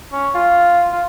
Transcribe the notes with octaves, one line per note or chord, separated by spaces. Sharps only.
C#4
F4
F4